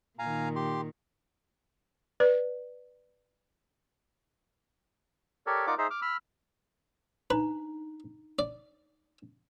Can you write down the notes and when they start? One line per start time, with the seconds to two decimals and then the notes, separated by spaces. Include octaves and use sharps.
0.19 A#2 D#3 F5 G#5 A#5
0.56 G4 C6
2.20 B4 D5
5.46 G4 A4 A#4 C#5 D5
5.67 D#4 F4 A#4 D5 F#5 D6
5.78 D#4 G#4 C5 E5 A#5
5.90 D6 F6
6.02 B5 E6 F6
7.30 D4 D#4 B4 A#5
8.39 D5